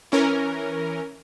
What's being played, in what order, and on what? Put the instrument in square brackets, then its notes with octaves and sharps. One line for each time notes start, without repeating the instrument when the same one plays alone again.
[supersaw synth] E3 C#4 A#4